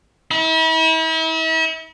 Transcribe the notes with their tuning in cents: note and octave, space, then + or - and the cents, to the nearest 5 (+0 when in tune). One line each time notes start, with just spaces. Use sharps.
E4 -40